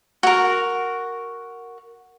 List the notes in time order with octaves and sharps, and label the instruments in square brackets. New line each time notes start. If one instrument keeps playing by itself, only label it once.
[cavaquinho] F#4 A#4